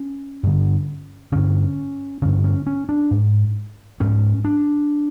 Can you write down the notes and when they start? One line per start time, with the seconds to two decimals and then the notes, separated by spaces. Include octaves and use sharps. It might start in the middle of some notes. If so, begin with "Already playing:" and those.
Already playing: C#4
0.43 G2 D3
1.32 G2 D3 C#4
2.22 G2 D3 C#4
2.44 C#4
2.67 C#4
2.89 D4
3.11 G#2
4.00 G#2 C#4
4.45 D4